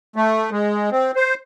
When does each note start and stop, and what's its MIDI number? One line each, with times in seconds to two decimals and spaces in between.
0.16 0.50 57
0.52 0.90 56
0.91 1.11 60
1.16 1.34 72